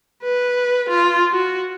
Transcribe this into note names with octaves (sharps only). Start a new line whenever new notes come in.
B4
F4
F#4